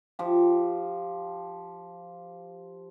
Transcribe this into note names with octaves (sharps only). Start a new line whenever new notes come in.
F3 G4